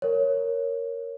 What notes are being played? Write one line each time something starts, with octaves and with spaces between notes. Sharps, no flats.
A#4 C#5